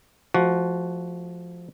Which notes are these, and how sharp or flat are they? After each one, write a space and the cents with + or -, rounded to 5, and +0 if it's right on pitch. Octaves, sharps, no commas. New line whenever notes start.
F3 +0 A3 -35 F#4 +0